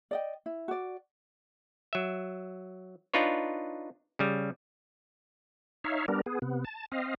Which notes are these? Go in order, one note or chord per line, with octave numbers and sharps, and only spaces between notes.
D5 D#5 G5
E4
F#4 D5
F#3 E5
D4 D#4 F4 B4 C#5
C#3 G3
D#4 C#5 E5 F5
G3 B3 D4 A#4
B3 G#4
C3 B3
A5
C4 D#5 F5